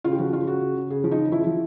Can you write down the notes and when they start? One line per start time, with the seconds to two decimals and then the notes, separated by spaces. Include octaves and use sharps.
0.04 C#3 F4
0.12 G4
0.19 F3 F#4
0.33 C#3 F4
0.47 C#3 F#4
0.61 C#3
0.76 C#3
0.90 C#3 G#4
1.04 F3
1.11 D#4
1.18 C#3
1.32 F3 E4
1.47 F3